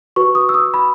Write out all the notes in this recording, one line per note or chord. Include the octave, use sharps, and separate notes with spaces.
F#4 B4 C#6
D#6
E6
D#6
B5